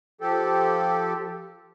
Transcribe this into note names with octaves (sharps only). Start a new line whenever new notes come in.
F3 G4 A4